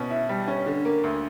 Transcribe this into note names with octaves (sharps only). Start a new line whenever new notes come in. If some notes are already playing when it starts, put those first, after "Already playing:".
Already playing: B2 C#4
E4
G3
C#4
D3
A#3
D2